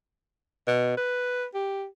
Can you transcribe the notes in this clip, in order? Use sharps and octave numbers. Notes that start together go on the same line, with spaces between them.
B2
B4
G4